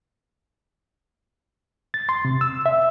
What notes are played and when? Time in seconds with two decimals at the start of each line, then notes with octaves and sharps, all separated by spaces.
1.94 A6
2.09 C6
2.25 C3
2.41 E6
2.66 E5